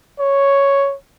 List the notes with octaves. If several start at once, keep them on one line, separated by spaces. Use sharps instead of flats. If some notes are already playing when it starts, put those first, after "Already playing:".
C#5